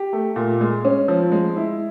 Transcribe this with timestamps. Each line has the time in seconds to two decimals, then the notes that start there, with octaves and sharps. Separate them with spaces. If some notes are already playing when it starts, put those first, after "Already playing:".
Already playing: G4
0.13 A3
0.36 A#2
0.61 G#3
0.85 C#4
1.08 F3
1.32 G#3
1.56 E4